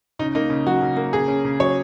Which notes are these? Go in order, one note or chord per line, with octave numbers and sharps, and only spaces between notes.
C#3 D#4
A#3 D#4
C#3
F#3 F#4
C#3
A#3
C#3 G#4
C#4
C#3
F#3 C#5